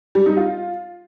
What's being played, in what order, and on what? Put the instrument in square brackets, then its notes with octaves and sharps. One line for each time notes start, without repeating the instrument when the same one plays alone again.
[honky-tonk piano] G3
D#4
F4